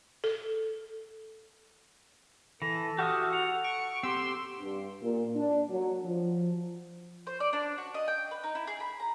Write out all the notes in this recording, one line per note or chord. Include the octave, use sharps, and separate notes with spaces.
A4
E3 A4 A#6
F#4 G4 E5 D#6 F6
F#5 F7
C#6 D7
C4 G4 C6 E6
G2
A#2
D4
F#3
F3
C5
D5
D4
F#4
D#5
G5
B4
D#4
E4
G#4
B5
A#5